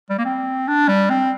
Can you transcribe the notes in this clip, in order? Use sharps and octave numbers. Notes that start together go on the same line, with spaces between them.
G3
A#3
C4
D4
G3
C4